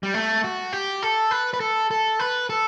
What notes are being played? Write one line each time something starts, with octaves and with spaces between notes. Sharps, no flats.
G3
A3
F#4
G4
A4
B4
B4
A4
A4
B4
A4